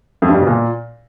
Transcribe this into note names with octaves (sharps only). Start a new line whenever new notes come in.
F2
G2
G3
B2
A#2